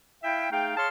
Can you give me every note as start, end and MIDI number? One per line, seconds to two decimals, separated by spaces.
0.23 0.51 64
0.23 0.51 76
0.23 0.51 77
0.23 0.51 79
0.52 0.74 57
0.52 0.74 63
0.52 0.74 68
0.52 0.74 77
0.52 0.74 79
0.76 0.88 68
0.76 0.88 73
0.76 0.88 77
0.76 0.88 81
0.76 0.88 84
0.76 0.88 89